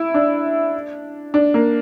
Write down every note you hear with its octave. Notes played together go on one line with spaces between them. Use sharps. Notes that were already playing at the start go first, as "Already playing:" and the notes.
Already playing: E4
D4
D4
A#3